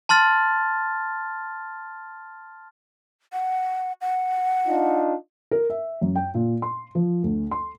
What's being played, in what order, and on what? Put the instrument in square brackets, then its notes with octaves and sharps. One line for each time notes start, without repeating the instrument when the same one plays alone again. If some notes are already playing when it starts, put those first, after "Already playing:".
[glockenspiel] A5 C6 F6 A6
[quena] F#5
F#5
[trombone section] D4 D#4 F4
[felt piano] A#4
E5
F#2
G5
A#2
C6
F3
D2
C6